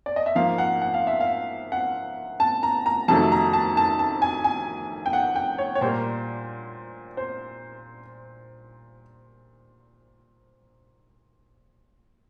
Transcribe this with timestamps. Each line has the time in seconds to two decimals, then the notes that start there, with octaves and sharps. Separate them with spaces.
0.06 D5
0.16 D#5
0.26 E5
0.35 G#2 F3 A#3 F5
0.58 F#5
0.82 F#5
0.94 F5
1.07 E5
1.20 F5
1.72 F#5
2.40 A5
2.63 A#5
2.86 A#5
3.08 F2 C3 D#3 F#3 A3 A5
3.32 A#5
3.53 A5
3.77 A5
3.99 A5
4.22 G#5
4.44 G#5
5.06 G5
5.13 F#5
5.36 G5
5.58 C#5
5.75 C#5
5.81 A#2 G3 A#3 C5
7.17 C5